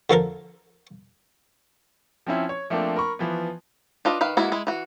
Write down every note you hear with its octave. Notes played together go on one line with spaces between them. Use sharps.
D3 F3 A4 A#4
F3 C4 C#4 E4
C#5
F3 A3 A#3 C4 D4
A#4 B5 C#6
E3 F3 B3
D4 F4 B4 D#5
D#3 B4 F5
G#3 A#3 B3 E4 F#4
G#3 E4
E3 F#4